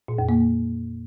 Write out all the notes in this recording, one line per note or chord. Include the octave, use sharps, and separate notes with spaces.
A#2
F2
A#3